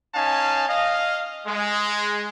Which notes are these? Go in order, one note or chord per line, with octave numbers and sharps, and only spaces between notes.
C#4 D#4 F5 G#5 A5
D#5 F5
G#3